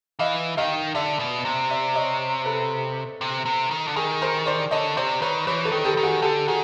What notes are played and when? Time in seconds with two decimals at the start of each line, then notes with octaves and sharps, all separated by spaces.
0.19 E3 D#5 F5
0.57 D#3 D#5 F5
0.95 D3 D5 E5
1.19 B2
1.45 C3
1.70 D5 E5
1.95 C#5 D#5
2.45 A4 B4
3.21 C3
3.46 C3
3.71 D#3
3.87 D3
3.96 D#3 G#4 A#4
4.22 A#4 C5
4.46 C5 D5
4.71 D3 C#5 D#5
4.97 C3 C5 D5
5.22 D#3 B4 C#5
5.47 E3 B4 C#5
5.65 A4 B4
5.72 D#3
5.85 G4 A4
5.97 D#3
6.03 F#4 G#4
6.22 D3 G4 A4
6.47 D#3 F#4 G#4